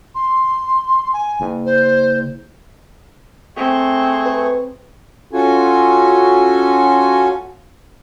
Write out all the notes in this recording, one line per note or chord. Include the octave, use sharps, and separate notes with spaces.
C6
G#5
F#1
C5
A3 C4 G#4 C#6
B4
C#4 F4 F#4 A4 G#5